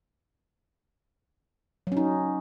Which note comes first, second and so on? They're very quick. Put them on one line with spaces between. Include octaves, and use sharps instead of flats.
F#3 C#4 D#4